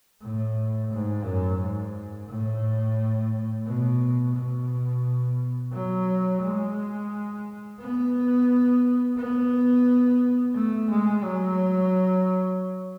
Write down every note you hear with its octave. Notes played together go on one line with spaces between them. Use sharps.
A2
G#2
F#2
G#2
A2
B2
B2
F#3
G#3
B3
B3
A3
G#3
F#3